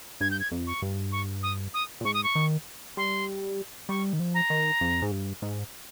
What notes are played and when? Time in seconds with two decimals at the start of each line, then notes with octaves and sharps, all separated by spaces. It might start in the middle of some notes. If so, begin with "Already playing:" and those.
0.21 G2 G#6
0.31 G6
0.40 G#6
0.51 F2
0.67 C#6
0.82 G2
1.12 C#6
1.43 D#6
1.74 D#6
2.01 A#2
2.05 G#2 C#6
2.14 D#6
2.24 C#6
2.35 D#3
2.97 G3 C6
3.89 G3 C#6
4.13 D#3
4.19 F3
4.34 A#5
4.50 D#3
4.81 F2
5.02 G#2
5.11 G2
5.42 G#2